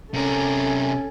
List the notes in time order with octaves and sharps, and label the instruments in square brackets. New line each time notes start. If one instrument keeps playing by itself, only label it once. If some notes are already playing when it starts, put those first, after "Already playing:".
[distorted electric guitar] C3 A#4 [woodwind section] C#4 [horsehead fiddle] A4 G#5